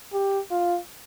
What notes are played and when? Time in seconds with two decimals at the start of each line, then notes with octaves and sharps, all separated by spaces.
0.13 G4
0.51 F4